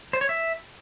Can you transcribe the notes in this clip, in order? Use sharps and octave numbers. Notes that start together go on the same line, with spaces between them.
C5
C#5
E5